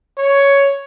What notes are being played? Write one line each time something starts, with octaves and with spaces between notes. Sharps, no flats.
C#5